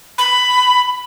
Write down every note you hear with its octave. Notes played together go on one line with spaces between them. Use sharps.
B5